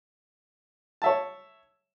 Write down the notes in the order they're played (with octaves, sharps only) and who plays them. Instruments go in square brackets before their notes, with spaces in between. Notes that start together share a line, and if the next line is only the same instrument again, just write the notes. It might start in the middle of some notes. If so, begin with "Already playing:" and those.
[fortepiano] C#5 E5 A5